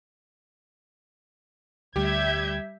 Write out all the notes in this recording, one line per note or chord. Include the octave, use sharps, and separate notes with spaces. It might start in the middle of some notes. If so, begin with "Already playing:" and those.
D2 G3 G4 E5 G6 G#6